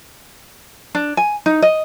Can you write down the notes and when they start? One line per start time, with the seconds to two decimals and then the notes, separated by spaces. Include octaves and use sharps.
0.95 D4
1.17 G#5
1.46 D#4
1.62 D#5